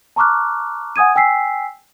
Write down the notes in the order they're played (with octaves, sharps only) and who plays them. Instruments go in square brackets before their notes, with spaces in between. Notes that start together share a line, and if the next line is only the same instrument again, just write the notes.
[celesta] A5 A#5 C#6 D6 F6 F#6
F#5 G#5 D#6 G#6 D#7
G5 G#5 E6 B6 C7